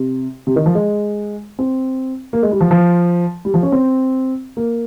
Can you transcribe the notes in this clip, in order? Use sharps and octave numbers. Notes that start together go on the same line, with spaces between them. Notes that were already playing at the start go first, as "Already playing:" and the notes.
Already playing: C3
C3
D#3
F3
G#3
C4
A#3
G#3
G3
F3
F3
G3
F3
C#4
C4
A#3